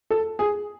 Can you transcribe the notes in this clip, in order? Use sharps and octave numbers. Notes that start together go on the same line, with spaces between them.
A4
G#4